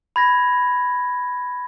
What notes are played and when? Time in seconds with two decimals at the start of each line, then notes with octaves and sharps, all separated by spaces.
0.16 B5 G#6 A#6